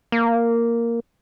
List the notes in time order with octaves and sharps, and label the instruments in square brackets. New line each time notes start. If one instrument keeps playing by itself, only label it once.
[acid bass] A#3